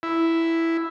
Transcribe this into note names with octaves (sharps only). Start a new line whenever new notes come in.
E4